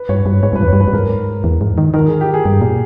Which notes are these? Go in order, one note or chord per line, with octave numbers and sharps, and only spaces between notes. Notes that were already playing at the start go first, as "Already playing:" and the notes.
Already playing: B4
G2 C#5
G2 B4
G#2 C#5
G2 B4
E2
G2 C#5
B4
G2
G#2 A#4
E2
G#2
D#3
D#3 A#4
G#4
G4
G#4
G2
A#2